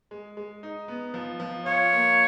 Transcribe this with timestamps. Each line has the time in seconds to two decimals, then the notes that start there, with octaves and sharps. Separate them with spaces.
0.11 G#3
0.37 G#3
0.63 D#4
0.88 B3
1.14 F3
1.40 F3
1.65 F4 C#5
1.92 A#3